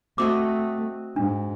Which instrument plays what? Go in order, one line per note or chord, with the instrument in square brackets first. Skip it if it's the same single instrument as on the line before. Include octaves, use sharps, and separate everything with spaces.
[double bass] A3 [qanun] C4 F#4 D#5 [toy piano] D6
[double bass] G#2 [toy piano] D4